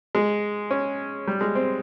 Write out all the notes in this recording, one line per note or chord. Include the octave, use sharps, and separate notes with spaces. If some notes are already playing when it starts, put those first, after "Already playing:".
G#3
C#4
G3
G#3
C4